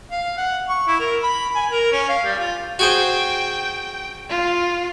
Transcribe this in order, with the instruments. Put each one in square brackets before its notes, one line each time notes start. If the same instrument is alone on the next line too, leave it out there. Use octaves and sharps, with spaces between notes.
[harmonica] F5
F#5
C#6
E4
A#4
B5
G#5
A#4
C#4
F5
G3
F4
[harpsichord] F#4 G#4 C5 [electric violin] G5
[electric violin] F4